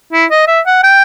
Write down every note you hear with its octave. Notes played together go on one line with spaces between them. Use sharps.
E4
D#5
E5
F#5
G5